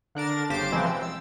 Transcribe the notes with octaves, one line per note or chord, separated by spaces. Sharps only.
D3 D4 A#4 A6
G1 C#3 G4 C5 D6 A6
B2 E3 F3 G3 G#3 C4
E6
E6